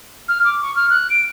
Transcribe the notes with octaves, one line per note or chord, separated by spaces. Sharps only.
F6
D6
C#6
F6
F#6
D7